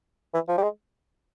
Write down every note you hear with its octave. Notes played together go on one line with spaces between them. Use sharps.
E3
F3
G3
G#3